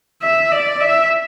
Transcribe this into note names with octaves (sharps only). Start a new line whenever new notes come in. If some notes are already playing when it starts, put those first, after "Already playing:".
E5
D5
E5